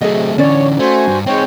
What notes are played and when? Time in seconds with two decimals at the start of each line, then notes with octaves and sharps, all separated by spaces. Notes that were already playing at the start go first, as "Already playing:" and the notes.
0.01 C3 F#3 A3 G#4 D#5
0.38 D3 E3 C#4 C#5 D5
0.79 A3 F#4 C5 G#5
1.08 G2
1.27 G#3 C4 D#4 C#5 G5